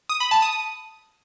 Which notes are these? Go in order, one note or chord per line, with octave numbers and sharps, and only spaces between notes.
D#6
B5
A5
D#6